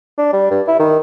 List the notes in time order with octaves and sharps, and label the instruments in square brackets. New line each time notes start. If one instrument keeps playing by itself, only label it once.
[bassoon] D4
G3
G2
E4
D#3